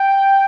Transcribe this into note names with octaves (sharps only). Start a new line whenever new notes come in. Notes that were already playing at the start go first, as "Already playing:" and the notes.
Already playing: G5